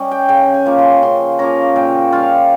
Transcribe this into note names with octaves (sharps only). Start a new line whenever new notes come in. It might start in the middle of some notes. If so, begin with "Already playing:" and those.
Already playing: G3 C#4 A#4 D#5
G5
C#3 G5
G#5
F3 A#3 C#4
C6
C#3 C6
F3 A#3 C#4 A#5
A#2 G5
G3 C#4 F4 F5